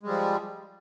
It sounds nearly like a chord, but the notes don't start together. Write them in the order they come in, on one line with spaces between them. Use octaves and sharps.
G#3 G3 F3